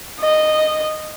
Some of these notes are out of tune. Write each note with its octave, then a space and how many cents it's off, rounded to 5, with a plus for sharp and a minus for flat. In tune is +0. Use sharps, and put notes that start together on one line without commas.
D#5 -10